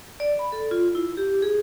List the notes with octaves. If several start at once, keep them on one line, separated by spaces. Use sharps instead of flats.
D5
B5
A4
F4
E4
G4
G#4